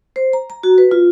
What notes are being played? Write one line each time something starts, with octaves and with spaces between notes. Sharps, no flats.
C5
A#5
A#5
F#4
B4
F4